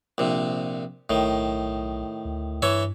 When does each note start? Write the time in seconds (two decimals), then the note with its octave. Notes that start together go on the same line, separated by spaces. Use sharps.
0.18 A#1 C3
1.10 B1 A2 D#3
2.25 D2
2.62 G2 E3 C#5 E5